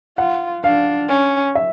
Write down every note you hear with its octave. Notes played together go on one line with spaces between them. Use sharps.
F4 F#5
D4 F5
C#4
E5